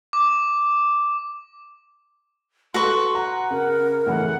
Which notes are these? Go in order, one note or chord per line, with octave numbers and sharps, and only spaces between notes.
D6
F#4 A4 B4 C6 C#6
F#5 A#5
C#3 A#4
A2 C#3 E3 F#5